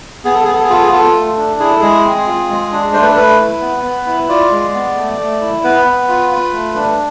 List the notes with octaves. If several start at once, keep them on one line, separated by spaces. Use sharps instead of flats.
B3 G#4
A4
B3 G#4
A4
G#4
F4 A4
G#4
F4 A4
A3
D4
E4 G#4
A4
G#3 G#4
C4
F4
G#3
D4
A3 C5
B4
A4
A3 B4
E4
B3
B3
E4
F4 D5
G#3
B3
A3
A3
E4
B3 B4
B3
F4
F4
A3
D4